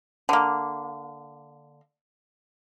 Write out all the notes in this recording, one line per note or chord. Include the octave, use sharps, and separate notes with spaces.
D3 A#3